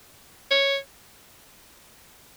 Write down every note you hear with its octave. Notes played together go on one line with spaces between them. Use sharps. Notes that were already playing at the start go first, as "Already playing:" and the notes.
C#5